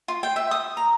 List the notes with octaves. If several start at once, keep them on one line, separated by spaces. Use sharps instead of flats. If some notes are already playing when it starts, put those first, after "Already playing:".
F4
G5
E5
D#6
A#5